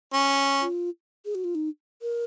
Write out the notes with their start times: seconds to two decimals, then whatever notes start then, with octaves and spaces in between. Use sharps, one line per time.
0.14 C#4
0.61 F4
1.25 G#4
1.35 F#4
1.44 F4
1.55 D#4
2.02 A#4